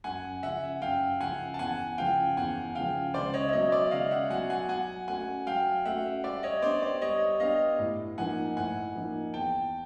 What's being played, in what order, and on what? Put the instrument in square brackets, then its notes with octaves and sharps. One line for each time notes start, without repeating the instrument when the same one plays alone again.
[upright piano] F#2 [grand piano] F#5 G#5
[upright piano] C#3 F3 [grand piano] E5 F#5
[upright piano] F#2 [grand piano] F5 G5
[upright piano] C#3 F3 [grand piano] F#5 G#5
[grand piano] A5
[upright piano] E2 [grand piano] F#5 G#5
[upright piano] C#3 F3 [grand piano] F5 G5
[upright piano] E2 [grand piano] F#5 G#5
[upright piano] C#3 F3 [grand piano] F5 G5
[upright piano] C#2 [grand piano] C5 D5
[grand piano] C#5 D#5
E5
[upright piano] B2 F#3 [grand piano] C#5 D#5
[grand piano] D5 E5
[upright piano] C#2 [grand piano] D#5 F5
[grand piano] E5 F#5
[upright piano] B2 F#3 [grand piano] F#5 G#5
[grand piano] F#5 G#5
[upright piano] F#3 [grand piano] F#5 G#5
[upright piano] A3 C#4 F#4 [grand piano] F#5 G#5
[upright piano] F#3 [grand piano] F5 G5
[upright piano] A3 C#4 F#4 [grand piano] E5 F#5
[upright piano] G3 [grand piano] D5 E5
[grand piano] C#5 D#5
[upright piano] B3 D4 G4 [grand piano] C5 D5
[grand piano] C5 D5
[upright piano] G3 [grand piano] C#5 D#5
[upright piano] B3 D4 G4 [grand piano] D#5 F5
[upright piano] A2
[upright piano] F3 A#3 D#4 [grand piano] F#5 G#5
[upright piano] A2 [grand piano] F#5 G#5
[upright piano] F3 A#3 D#4
[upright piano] E2 [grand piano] G5 A5